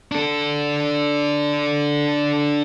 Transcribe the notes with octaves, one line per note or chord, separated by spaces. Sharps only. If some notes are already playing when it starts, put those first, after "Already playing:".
D4 A4